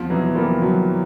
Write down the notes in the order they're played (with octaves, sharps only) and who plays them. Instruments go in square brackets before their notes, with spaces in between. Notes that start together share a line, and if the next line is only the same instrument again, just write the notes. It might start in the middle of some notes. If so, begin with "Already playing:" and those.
Already playing: [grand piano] E2 [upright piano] F3
[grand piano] B2 [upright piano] E3 F#3
[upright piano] F3 G3 [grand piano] A#3
[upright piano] F3 [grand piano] F#3